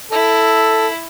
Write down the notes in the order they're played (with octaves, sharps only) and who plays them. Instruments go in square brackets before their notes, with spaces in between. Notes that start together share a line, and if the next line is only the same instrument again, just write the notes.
[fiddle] E4 [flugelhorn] A4